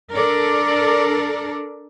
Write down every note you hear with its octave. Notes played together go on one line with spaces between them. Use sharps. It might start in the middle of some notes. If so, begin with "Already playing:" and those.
D4 A4 A#4 D5